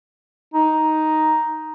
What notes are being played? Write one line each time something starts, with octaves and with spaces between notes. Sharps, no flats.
D#4